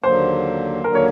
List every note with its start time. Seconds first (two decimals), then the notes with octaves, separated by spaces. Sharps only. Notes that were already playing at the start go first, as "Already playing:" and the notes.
0.04 D#2 D3 F#3 A#3 C5
0.84 D#2 D3 F#3 A#3 A#4
0.95 C#5